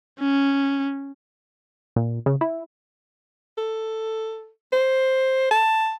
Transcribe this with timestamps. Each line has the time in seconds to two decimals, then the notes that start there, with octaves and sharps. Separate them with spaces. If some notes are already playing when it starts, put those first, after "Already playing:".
0.20 C#4
1.96 A#2
2.26 C#3
2.41 E4
3.58 A4
4.73 C5
5.51 A5